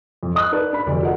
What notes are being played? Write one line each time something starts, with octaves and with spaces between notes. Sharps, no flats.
F2
D#5 D#6 F6 F#6
D#4 A#4 B4 D5 A5
D4 B5
F1 D2 D5
F4 G#4 A#4 D#5 F#5